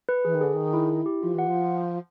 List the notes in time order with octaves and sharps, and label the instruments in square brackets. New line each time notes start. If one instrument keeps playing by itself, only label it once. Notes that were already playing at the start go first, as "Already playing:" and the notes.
[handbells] B4
[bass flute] E3 [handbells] G#4
[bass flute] D#3
[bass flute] D3 [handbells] G#4
[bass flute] D#3 [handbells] G#4
[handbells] E4
E4
G4
[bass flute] F3 [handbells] F4
[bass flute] E3 [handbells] F#5
[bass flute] F3